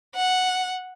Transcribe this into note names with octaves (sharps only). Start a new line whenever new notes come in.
F#5